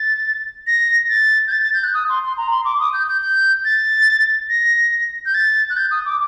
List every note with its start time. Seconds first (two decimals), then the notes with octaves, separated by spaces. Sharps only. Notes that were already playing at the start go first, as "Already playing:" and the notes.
Already playing: A6
0.67 A#6
1.09 A6
1.48 G6
1.52 A6
1.63 A6
1.74 G6
1.84 F#6
1.94 D#6
2.09 C6
2.23 C6
2.37 A#5
2.51 C6
2.65 D6
2.80 D#6
2.93 G6
3.08 G6
3.22 G6
3.65 A6
4.49 A#6
5.26 G6
5.34 A6
5.70 F#6
5.76 G6
5.91 D#6
6.06 D6